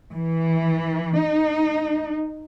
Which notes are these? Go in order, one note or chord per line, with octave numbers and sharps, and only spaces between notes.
E3
D#4